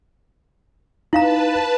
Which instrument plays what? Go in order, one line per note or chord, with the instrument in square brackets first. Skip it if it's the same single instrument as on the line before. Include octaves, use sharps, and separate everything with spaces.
[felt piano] D#4 [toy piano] E4 F5 A#5 [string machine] B4 A5